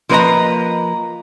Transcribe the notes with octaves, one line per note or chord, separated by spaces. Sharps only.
F3 A#3 B4 D5 D#5 A#5